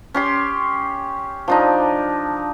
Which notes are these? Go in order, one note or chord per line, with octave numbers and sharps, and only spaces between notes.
C#4 G4 C6
F3 D4 D#4